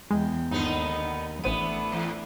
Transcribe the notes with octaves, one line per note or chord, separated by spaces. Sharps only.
E2 G#3 G5
G1 D#2 D3 B3 D#4
A1 A3 B3 D4 E4 C5 D#7
E2